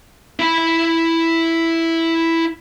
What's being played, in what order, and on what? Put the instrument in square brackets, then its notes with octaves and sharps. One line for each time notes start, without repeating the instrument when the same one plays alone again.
[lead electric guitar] E4 B5